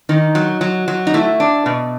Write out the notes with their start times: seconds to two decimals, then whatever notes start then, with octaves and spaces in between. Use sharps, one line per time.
0.09 D#3 D#4
0.35 F#3
0.61 F#3
0.88 F#3
1.07 D#4
1.14 A3 E4
1.40 D4
1.66 B2